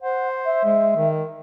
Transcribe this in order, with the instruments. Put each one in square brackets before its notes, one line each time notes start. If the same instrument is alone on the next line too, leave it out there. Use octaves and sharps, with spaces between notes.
[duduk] C5 [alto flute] F#5
[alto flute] E5
[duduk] G#3
D#3